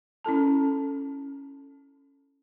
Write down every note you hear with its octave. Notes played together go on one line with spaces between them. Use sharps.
C#4 E4 A4 A5